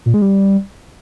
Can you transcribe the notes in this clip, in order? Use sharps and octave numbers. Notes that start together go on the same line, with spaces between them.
A#2
G#3
G3